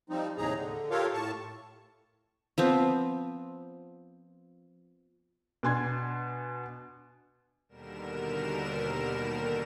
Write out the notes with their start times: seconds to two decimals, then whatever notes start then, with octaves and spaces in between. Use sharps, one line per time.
0.10 F3 G3 C4 D#4
0.38 D#2 A2 C3 D#4 G#4 A#5
0.55 D3
0.91 F4 G4 A4 A#4 C#5 F5
1.14 A2 A5 C#6
2.58 F3 B3 C4
5.63 B2 D4 G#5 C6 G#6
7.69 D#2 B2 D3 G3 A#4 E7